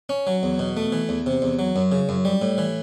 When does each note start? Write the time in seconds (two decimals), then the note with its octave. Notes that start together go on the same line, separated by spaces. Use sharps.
0.09 C#4
0.27 F#3
0.43 E2
0.59 B2
0.77 A3
0.92 E3
1.09 E2
1.26 C3
1.42 E2
1.59 F#3
1.76 F#2
1.92 C#3
2.09 F#2
2.25 G3
2.42 A2
2.58 E3